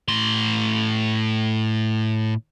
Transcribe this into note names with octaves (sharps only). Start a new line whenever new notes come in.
A2 C6